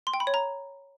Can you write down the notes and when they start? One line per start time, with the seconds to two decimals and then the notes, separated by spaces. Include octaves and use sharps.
0.07 C6
0.14 G5
0.20 B5
0.27 C#5
0.34 A#5